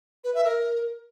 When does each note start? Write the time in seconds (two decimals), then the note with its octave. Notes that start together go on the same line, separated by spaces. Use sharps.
0.24 B4
0.34 E5
0.45 A#4